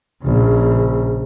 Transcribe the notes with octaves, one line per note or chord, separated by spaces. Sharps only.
A#1 C#3